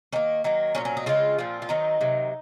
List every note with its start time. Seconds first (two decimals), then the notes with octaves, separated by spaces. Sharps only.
0.13 D#3 A#3 C#4
0.44 D#3 F#3 A#3
0.75 A#2 F#3 C4 C#4
0.85 C#4
0.97 D#4
1.06 C#3 G#3 C4 F4
1.38 A#2 F3 C4
1.62 F4
1.69 D#3 F#3 C4 D#4
2.01 C3 D#3 F#3